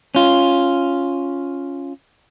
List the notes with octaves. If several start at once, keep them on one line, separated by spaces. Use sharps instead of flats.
C#4 F4